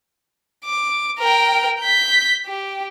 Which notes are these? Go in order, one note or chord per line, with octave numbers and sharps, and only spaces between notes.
D6
A#4 G5
G6 B6
G4